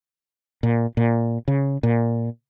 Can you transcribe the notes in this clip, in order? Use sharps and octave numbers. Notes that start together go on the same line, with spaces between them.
A#2
A#2
C#3
A#2